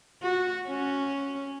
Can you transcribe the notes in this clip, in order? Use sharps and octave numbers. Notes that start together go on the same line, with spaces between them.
F#4
C#4